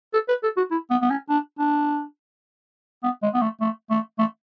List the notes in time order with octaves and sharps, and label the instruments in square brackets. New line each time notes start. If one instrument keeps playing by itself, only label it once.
[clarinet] A4
B4
A4
F#4
E4
B3
B3
C#4
D4
D4
B3
G#3
B3
A3
A3
A3
A3